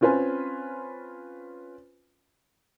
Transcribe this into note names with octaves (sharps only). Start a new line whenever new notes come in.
C4 C#4 F4 B4 C5 G#5